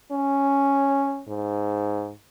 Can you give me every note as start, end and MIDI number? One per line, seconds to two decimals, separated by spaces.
0.12 1.21 61
1.28 2.11 44